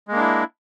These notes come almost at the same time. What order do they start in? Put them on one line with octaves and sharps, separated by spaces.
G#3 A#3 D4 E4